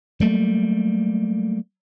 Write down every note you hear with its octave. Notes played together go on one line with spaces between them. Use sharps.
F#3 G3 A3 A#3